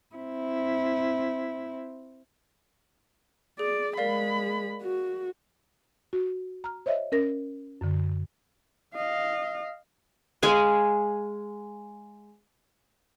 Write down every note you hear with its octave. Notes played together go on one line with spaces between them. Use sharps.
C4 E4
G#4 D5
G#3 A#4 D5 F5 B5
F#4
F#4
A#5 F6
C5 C#5 D#5 E5
C#4 A#4 A#6
F#2 D3
D#5 F5
G#3 F5 G#5